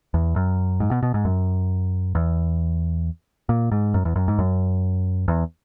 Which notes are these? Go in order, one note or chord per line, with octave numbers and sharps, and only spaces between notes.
E2
F#2
G#2
B2
B2
G#2
F#2
E2
A#2
G#2
F#2
E2
F#2
G#2
F#2
E2